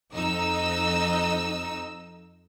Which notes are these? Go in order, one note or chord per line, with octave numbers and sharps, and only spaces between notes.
F2 D#4 E6